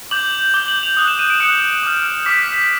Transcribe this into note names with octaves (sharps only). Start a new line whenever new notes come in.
D6 G6 F#7
D6 G6 G7
F#7
F7
D#6 F#6 F7
E7
D#7
D7
D#6 F#6 C#7
D6 F6
D6 F6 B6